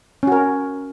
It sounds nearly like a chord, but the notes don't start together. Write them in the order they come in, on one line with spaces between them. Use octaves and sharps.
C#4 F#4 A#4